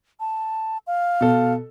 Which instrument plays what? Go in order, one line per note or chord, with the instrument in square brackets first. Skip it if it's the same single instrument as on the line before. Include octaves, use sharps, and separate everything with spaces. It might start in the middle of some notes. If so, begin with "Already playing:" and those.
[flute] A5
F5
[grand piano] B2 A4